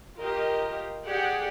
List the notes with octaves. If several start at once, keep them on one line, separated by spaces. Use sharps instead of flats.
F4 G4 A#4 D#5
G4 G#4 D5 F#5 G5